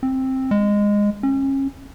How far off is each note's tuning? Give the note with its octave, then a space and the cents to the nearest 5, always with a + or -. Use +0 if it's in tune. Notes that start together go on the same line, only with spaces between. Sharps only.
C4 +10
G#3 -15
C#4 -30